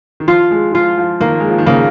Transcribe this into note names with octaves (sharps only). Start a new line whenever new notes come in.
D#3
F3 F4
G#3
F3 F4
F3
D#3 A#3
G#3
F3
D#3
C#3 A#3